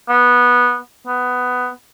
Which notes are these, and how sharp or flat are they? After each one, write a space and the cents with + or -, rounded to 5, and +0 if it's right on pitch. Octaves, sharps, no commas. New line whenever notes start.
B3 -15
B3 +10